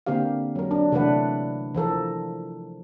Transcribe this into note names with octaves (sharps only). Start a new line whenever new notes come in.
D3 A#3 C4 G4 F5
F#3 A#4
D4
C3 E3 A3 D4 B4 F#5
E3 F3 A4 A#4